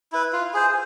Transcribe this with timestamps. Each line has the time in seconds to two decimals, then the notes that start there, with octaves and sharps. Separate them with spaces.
0.12 E4 B4
0.33 F4
0.54 G#4 C5